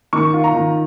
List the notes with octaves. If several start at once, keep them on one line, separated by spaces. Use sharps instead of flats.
D#3 C#6
F4
A#5
D#3